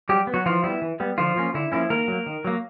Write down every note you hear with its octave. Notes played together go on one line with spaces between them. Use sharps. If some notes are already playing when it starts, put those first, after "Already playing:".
F#3 G3 G4
B3
F#3 F#4
E3 F3 F4
G3 B3 E4
E3
G3 B3
D3 F3 F4
F3 A#3 C#4
D3 E4
F3 A#3 C#4 E4
D#3 A#3 A#4
F#3 A#3
D#3
F#3 A#3